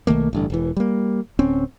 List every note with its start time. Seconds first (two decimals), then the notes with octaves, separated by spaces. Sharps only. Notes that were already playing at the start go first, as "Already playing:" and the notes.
0.07 B1 D#3 A3 A#3
0.33 A1 G2 D3
0.50 E1 E3
0.77 G3 A#3
1.39 D1 C4 C#4